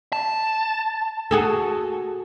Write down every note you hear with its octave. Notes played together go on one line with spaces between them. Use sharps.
A5
F#4 G#4 A4